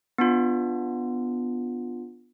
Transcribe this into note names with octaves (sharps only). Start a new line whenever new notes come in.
B3 D4 F4